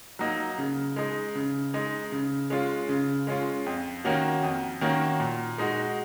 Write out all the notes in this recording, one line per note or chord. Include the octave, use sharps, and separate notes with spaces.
F#3 A#3 D#4
C#3
G#3 D#4
C#3
G#3 D#4
C#3
G#3 C#4 F4
C#3
G#3 C#4 F4
F2
D#3 A#3 C#4 F#4
F2
D#3 A#3 C#4 F#4
A#2
G#3 D#4 F#4